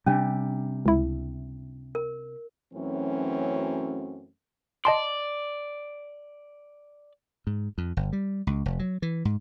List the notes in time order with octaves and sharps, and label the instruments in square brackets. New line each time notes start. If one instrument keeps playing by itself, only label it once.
[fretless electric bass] C3 G3 [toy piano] C#4 D4
[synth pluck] C#2 E4
[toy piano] A#4
[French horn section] F#2 E3 F#3 A3 C4 C#4
[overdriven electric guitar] D5 [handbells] D#5 A5 C6
[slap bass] G#2
F2
G1
G3
C#2
F1
F#3
E3
G#2